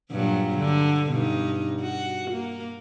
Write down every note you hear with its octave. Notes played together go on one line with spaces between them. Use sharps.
G2 A#2 F#3
D3
G2 B2 D#4
F#4
A#3